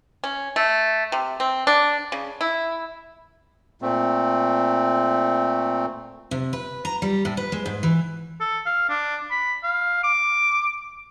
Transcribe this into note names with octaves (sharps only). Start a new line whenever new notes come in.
C#4
A3
C3
C4
D4
C#3
E4
A#2 A3 C4
C3
B4
A#5
G3
A2
B4
G#3
G#2
E3
A4
F5
D4
B5
F5
D6